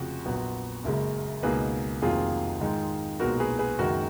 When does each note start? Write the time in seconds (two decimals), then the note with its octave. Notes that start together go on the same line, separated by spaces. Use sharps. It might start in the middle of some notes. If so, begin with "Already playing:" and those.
Already playing: F1 F2 C#3 F3 F#4
0.25 A#1 A#2 F#3 B3
0.84 F#1 F#2 C#3 G#3
1.43 C#2 B2 A#3 D#4 G#4 B4
2.02 F1 F2 D#3 F#3 A#3 F4 G#4
2.61 G#2 D#3 G#3 D#4
3.20 B1 A#2 G#3 B3 D#4 F#4 A#4
3.40 G#4 B4
3.59 G#4 B4
3.78 F#1 F#2 D#3 G#3 D#4 F#4 A#4